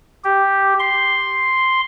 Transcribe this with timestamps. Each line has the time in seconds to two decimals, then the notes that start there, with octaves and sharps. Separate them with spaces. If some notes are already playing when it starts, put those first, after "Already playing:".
0.24 G4
0.80 C6